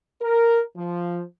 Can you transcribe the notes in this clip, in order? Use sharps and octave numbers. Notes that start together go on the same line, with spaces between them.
A#4
F3